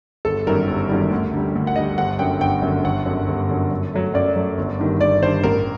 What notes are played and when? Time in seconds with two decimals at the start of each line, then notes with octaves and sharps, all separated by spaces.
0.25 G1 A4
0.47 F#2 D#3 G3 A#4
0.68 G1
0.89 F#2 D#3 G3
1.11 D2
1.34 D3 G3
1.55 D2
1.67 F#5
1.76 D3 G3 D#5
1.98 G1 F#5
2.19 F#2 D3 G5
2.41 G1 G5
2.62 F#2 D3
2.84 G1 F#5
3.06 F#2 D3
3.28 G1
3.49 F#2 D3
3.71 F#2
3.93 F#3 A3
4.14 F#2 D5
4.36 F#3 A3
4.58 G1
4.80 G2 D#3
5.01 G1 D5
5.22 G2 D#3 C5
5.44 A1 A#4